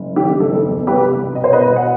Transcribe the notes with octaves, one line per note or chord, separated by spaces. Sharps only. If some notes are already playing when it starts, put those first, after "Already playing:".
Already playing: F#1
D#3 G4
F#1 A4
E2
C2 G4 B4
C2
B2 D#5
C5
B4 D#5
B2
F#5